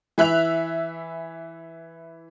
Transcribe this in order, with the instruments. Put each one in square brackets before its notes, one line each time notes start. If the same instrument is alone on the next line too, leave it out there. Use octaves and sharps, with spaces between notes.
[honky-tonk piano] E3 E5 F#6 F7